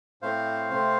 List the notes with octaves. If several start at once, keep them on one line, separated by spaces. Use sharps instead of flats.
A2 A3 C4 C5 F5
C3 A3 C4